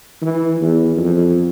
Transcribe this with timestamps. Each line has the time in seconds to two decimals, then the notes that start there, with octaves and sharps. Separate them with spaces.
0.22 E3
0.61 E2
0.97 F2